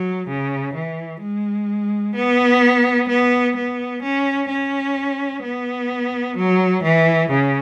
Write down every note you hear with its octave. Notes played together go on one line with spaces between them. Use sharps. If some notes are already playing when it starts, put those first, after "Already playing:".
Already playing: F#3
C#3
E3
G#3
B3
B3
B3
C#4
C#4
B3
F#3
E3
C#3